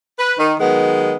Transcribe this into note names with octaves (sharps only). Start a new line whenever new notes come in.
B4
D#3
D#3 F#3 G#3 B3